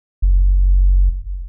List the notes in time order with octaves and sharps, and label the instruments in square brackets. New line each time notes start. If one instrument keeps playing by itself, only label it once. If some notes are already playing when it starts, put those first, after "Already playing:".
[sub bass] F#1